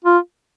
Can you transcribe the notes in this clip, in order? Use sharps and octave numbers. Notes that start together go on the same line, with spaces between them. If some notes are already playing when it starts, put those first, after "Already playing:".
F4